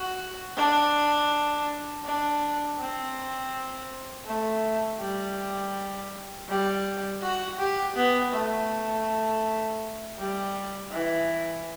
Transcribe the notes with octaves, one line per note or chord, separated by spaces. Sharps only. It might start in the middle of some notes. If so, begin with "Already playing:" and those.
Already playing: F#4
D4
D4
C4
A3
G3
G3
F#4
G4
B3
A3
G3
E3